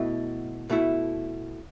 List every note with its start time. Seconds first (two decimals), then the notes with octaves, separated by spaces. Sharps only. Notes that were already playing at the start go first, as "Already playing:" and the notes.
Already playing: B2 A3 E4
0.70 B2 A3 E4